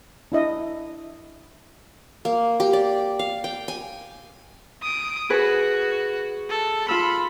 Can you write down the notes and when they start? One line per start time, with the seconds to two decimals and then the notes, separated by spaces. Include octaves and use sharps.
0.32 D4 E4 D#5 E5
2.25 A#3
2.60 G4
2.73 D5
3.19 F5
3.44 G5
3.68 G#5
4.82 D#6 D7
5.30 F#4 G#4 B4
6.50 A4
6.88 F4 B5 E6